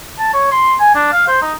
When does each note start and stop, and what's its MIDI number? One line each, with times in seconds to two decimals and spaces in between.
0.19 0.30 81
0.34 0.51 73
0.52 0.75 84
0.80 0.94 80
0.95 1.10 62
1.13 1.27 77
1.28 1.40 72
1.42 1.52 63